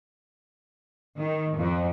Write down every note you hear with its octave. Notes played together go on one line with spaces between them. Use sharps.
D#3
F2